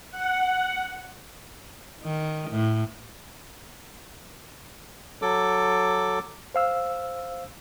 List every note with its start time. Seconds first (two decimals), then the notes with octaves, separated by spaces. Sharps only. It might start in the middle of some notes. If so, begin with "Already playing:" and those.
0.11 F#5
2.04 D#3
2.50 A2
5.22 F#3 A4 D6
6.54 C5 F5 E6